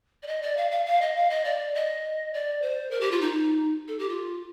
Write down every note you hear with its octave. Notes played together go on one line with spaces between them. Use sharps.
D5
D#5
D5
F5
F5
F5
D#5
F5
D#5
D5
D#5
D5
C5
A#4
G4
F4
D#4
A4
G4
F4